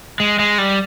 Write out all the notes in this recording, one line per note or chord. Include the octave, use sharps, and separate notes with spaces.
G#3
G#3
G3